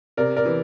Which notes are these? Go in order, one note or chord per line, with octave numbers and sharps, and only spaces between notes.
C3 A#4 D5
A#4 D5
E3